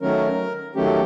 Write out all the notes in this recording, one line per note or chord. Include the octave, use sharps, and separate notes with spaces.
D#3 F#3 A3 C#4 A#4
D#3 F#3 A3 C#4 G4